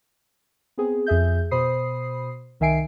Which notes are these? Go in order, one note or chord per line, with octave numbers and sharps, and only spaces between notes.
B3 C4 G#4
F2 G#4 E5 G6
B2 C5 B5 D#6 C7
C2 D#3 E5 G#5 C7 D7